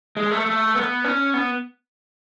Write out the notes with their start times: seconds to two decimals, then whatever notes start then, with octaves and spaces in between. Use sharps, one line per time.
0.17 G#3
0.31 A3
0.46 A3
0.75 B3
1.04 C#4
1.34 B3